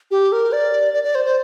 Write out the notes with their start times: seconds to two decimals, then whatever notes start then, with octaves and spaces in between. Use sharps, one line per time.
0.11 G4
0.32 A#4
0.53 D5
0.94 D5
1.04 D5
1.15 C5
1.25 C5